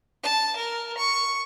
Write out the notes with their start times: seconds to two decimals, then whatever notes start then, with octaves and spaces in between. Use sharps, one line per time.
0.23 A5
0.56 A#4
0.98 C#6